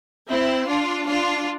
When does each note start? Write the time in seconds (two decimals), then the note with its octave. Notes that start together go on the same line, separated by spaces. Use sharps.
0.29 C4 E4
0.67 D4 F4
1.06 D4 F4